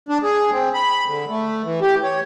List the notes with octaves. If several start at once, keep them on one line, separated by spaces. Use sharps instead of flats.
D4
G#4
C4
B5
D3
A3
E3
G4
C#5